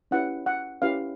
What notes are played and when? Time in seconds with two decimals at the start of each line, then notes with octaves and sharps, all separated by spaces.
0.11 C#4 E4 G4 B4 F#5
0.46 F#5
0.82 C#4 E4 G4 B4 F5